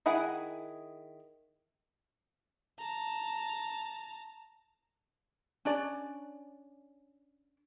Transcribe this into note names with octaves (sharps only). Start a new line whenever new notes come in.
D#3 E4 G#4 F#5 G#5
A5 A#5
C#4 D4 D5